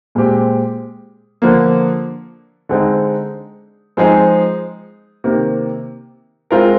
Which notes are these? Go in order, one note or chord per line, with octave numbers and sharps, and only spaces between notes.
A#2 G#3 C4 G4
D3 F3 A#3
D3 G#3 C4 D#4
F3 G#3 C4 D#4 G#4
C3 D#3 A#3
G#3 C4 F4 A#4